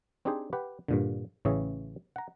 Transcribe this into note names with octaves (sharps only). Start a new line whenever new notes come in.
C4 D4 D#4 G4 G#4 C5
G4 B4 F#5
G2 A#2 D3
A1 C#3 E3 C#4 G#4 E5
F#5 A#5